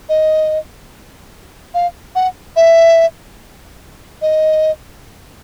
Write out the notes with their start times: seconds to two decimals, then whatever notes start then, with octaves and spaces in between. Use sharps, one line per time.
0.09 D#5
1.74 F5
2.15 F#5
2.56 E5
4.22 D#5